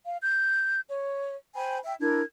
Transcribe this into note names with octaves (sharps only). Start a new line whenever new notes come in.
F5
G6
C#5
C5 G5 G#5 B5
E5 G5
D4 E4 A#4 G#6